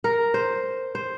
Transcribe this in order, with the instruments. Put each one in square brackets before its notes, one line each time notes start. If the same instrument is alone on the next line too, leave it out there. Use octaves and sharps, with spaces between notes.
[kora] A#4
C5
C5